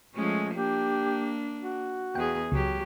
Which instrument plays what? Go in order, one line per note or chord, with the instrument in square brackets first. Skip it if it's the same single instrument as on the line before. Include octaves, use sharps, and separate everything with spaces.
[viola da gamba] F3 G#3 C#4 [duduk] A3
[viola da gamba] A#3 D4 [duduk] G4
[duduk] F#4
[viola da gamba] E2 G#4 [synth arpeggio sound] G5
[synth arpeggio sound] C#2 [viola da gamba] F#3 G4